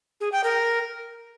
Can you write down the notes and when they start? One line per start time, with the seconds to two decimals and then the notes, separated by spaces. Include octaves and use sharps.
0.20 G#4
0.32 G5
0.44 A#4